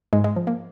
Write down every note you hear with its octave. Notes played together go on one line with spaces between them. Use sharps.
G#2 G#3
G#3
F3
A#3